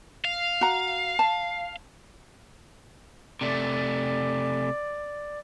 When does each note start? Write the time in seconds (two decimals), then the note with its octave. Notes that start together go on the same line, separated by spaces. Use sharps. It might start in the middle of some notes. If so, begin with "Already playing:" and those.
0.25 F5
0.61 F#4 A#5
1.19 A5
3.41 C3 A3 D5